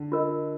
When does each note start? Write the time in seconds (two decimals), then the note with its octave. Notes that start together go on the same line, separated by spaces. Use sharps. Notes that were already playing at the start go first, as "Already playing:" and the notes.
Already playing: D3
0.12 F4 A#4 D#5